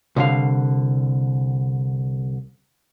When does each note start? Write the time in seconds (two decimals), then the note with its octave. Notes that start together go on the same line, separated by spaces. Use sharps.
0.16 C2 D3 F5